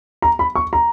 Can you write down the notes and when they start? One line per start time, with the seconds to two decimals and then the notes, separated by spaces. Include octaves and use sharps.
0.22 A#5
0.39 B5
0.55 C#6
0.73 A#5